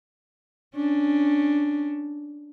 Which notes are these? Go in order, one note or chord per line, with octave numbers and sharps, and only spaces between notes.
C#4 D4